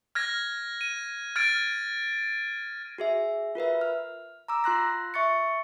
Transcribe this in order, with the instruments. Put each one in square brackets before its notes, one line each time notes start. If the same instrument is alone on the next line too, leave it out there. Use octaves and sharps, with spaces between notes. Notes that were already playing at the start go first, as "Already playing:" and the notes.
[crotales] F6 G#6 A#6
D#7
F6 G#6 A6 D7
[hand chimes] F#4 G#4 E5
F4 A#4 B4 E5
F6
A#5 D6 E6
F4 C6 F#6 A#6
E5 C#6 A6 C#7